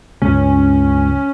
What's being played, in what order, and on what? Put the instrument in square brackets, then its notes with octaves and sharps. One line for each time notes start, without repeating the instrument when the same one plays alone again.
[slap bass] C#2 G2 [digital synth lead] C#4